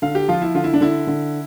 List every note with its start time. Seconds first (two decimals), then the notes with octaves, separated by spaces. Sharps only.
0.02 D3 F5
0.15 G4
0.28 F3 F4
0.42 E4
0.55 D3 F4
0.64 E4
0.74 D4
0.81 D3 E4
1.07 D3